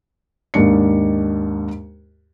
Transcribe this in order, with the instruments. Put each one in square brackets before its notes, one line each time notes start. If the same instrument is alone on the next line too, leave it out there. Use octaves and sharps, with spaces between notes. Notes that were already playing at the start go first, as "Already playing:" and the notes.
[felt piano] D#2 G#2 D4 C#7